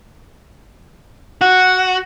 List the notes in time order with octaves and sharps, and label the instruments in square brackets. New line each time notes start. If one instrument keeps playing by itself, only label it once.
[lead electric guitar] F#4 [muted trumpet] F#5